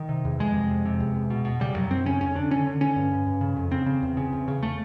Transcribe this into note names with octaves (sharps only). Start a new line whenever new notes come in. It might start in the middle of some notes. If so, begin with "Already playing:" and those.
Already playing: D#3
C3
E2
F2 G#3
C3
F2
C3
E2
E2
B2
B2
C#3 G3
F#2 F#3
F#2 C4
C#3 C#4
F2 C#4
D3 D4
D3 C#4
D3
D3 C#4
G2
G2
G2
C#3
F2
C#3 C4
C#3
E2
C#3
E2
C#3
A3